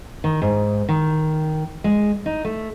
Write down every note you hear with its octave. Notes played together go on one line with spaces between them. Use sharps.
D#3
G#2
D#3
G#3
D#4
A3